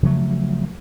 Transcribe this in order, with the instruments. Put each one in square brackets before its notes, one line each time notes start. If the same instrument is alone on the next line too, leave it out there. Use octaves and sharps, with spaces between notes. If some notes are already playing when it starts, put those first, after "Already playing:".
[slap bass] C#3 F3 F#3 A3